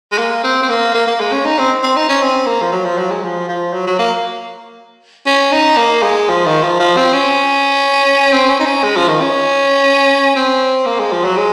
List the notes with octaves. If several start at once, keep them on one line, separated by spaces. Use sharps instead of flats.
G#3
A#3
C4
C4
A#3
A#3
A#3
G#3
C#4
D#4
C4
C4
D#4
C#4
C4
A#3
F3
F#3
F3
F#3
G#3
F3
F3
F#3
F#3
A#3
C#4
D#4
A#3
G#3
F3
D#3
F3
F3
C4
C#4
C4
C#4
D#4
C#4
G#3
F3
D#3
C#4
C4
A#3
G#3
F3
F#3
G#3